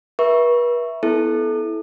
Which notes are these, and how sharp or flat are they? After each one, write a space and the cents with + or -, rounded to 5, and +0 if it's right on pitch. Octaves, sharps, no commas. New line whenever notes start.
B4 -40 E5 +0 C#6 +0
B3 +10 E4 -10 A4 -20